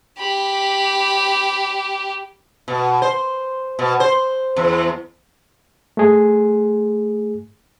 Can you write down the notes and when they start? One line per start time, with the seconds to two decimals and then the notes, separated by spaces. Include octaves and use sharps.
0.19 G4 B5
2.68 B2
3.02 C5
3.79 B2
4.00 C5
4.57 E2
5.97 A3 G#4 G#5